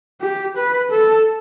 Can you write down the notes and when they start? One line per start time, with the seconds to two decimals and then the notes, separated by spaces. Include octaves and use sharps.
0.21 G4
0.57 B4
0.91 A4